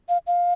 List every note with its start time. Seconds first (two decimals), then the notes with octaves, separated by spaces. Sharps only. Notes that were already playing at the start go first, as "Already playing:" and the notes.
0.09 F5
0.27 F5